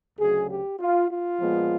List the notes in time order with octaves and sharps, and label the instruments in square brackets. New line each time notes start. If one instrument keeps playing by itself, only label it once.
[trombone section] D2 C#3 F#3 G#4
G4
F4
F4
A#2 F3 G#3 B3